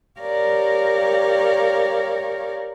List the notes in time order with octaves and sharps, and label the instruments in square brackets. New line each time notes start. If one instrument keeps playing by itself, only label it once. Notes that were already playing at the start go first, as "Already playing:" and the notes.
[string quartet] G4 A#4 C#5 D5 F5